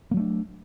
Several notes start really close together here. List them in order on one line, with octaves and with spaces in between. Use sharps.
A#3 F#3 A3 D4